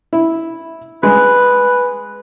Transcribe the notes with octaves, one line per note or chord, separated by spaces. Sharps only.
E4
G#3 B4